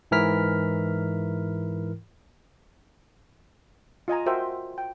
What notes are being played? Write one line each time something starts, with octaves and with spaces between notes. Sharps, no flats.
G#2 E3 E4 A#4 F6 B6
F4 D#5 G#5 A#5
F#4 A#4 C5 E5 G5
G5